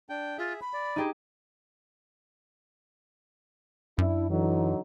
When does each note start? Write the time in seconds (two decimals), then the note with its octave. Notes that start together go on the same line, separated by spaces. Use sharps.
0.10 D4 G5
0.38 F4 G#4 E5
0.61 B5
0.74 D5
0.96 D#4 G4 G#4
3.98 F#2 D4 E4
4.30 D3 E3 F#3 D#4